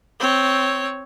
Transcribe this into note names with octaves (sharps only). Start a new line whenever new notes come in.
C4 C#5